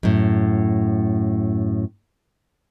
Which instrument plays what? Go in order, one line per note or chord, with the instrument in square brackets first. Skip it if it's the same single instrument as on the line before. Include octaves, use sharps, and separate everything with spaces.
[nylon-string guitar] F#2 A2